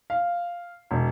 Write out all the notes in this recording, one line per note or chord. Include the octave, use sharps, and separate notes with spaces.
F5
E1